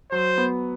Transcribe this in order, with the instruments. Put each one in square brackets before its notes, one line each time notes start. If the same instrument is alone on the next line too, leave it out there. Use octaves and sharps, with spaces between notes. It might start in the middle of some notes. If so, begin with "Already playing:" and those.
[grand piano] F#3 [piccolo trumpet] C5
[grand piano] B3